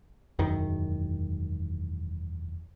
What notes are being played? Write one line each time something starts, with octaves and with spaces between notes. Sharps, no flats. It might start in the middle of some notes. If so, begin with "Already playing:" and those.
E1 F#2 D#3